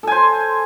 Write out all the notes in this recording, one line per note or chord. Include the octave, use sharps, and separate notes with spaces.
A4 C5 G#5